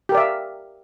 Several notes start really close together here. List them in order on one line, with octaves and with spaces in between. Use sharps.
G4 A#4 D5 E5 F5